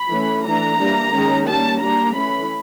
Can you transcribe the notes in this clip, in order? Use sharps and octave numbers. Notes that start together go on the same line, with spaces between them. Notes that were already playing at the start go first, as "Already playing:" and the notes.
Already playing: B5
E3 A3 C#4
E3 A3 D4 A#5
E3 G3 A#3 D4
D#3 G#3 C#4
G3 A#3 C#4 A5
G3 A#3 D4 A#5
E3 A3 C#4 B5